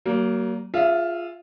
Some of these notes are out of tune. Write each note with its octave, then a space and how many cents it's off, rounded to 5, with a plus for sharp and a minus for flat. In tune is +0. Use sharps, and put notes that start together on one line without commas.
F#3 +35 A#3 +0
F4 +0 G#4 +0 E5 +25